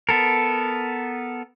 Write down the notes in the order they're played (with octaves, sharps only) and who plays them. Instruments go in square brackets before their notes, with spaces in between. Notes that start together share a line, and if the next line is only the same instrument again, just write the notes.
[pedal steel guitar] B3 A4 A#4